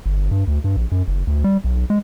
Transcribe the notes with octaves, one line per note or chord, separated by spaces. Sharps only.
G1
G2
D2
G2
A#1
F#2
F#1
D2
G3
B1
G#3